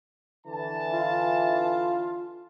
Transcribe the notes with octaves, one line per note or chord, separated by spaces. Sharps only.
D3 E3 A5
F4